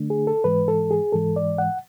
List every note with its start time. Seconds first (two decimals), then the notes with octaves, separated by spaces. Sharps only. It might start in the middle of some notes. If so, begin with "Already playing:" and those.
Already playing: D3 A3 D4
0.10 G#4
0.27 A4
0.44 G#2 E3 G#3 B4
0.68 A4
0.91 G#4
1.12 G#2 E3 G#3 A4
1.36 D5
1.58 F#5